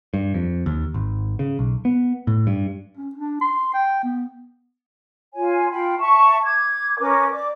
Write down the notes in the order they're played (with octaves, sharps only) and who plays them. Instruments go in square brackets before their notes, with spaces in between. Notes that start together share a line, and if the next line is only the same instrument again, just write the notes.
[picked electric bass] G2
F2
D#2
G#1
C#3
B1
B3
A2
G2
[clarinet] C#4
D4
C6
G5
B3
[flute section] F4 C#5 G#5
F4 G5 B5
E5 A5 C#6
D6 G#6
C#4 A#4 B4 D6
D5 D6